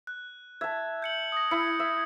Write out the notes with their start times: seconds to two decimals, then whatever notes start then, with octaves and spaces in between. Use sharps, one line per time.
0.07 F#6
0.61 E5 A5 G#6
1.02 G6 C#7 F#7
1.32 D#6 A#6
1.51 E4 C#7
1.79 E5